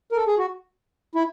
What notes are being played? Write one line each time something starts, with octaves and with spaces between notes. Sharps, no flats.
A#4
A4
G#4
F#4
E4